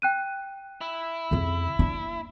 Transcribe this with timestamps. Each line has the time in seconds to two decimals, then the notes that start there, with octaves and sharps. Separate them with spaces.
0.02 G5 F#6 D#7
0.81 E4
1.31 F2 C#3
1.79 A#3 D4